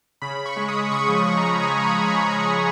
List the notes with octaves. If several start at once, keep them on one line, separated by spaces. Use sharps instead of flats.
C#3 B5
C#3
C#6
G#3
D#6
G#3
C#3 C#6
F3
B5
C#3
A#5
C#3
A#5
C#3 G#5
F3
B5
F3
D#6
C#3
G#3 D#6
C#3